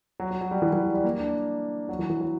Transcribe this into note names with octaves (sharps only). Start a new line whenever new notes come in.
F#3
F#3
F#3
G3
E3
E3
G3
G3
A#3
D4
F#3
E3
E3
F#3